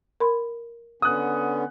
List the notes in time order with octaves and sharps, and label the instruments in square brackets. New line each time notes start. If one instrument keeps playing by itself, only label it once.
[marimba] A#4 B5 C6
[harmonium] D3 B3 C#4 [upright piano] D#6 F#6